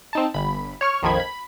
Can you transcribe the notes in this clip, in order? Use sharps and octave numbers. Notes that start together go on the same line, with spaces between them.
C4 D#4 A5
G1 B5
C#5 C#6 F6
A#1 F2 D#3 F3 B5 G#6
B5